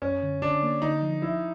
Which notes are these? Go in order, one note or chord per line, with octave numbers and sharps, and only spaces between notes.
F#2 C#4
D3
D3 D4
A#3
D3 D#4
F3
F3 E4